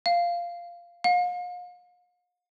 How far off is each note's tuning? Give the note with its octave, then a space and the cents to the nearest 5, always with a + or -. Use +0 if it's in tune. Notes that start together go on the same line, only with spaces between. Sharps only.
F5 -10
F5 +40